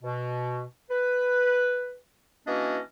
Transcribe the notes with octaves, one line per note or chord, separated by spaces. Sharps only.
B2
B4
E3 A#3 C#4 D4 F#4 D#5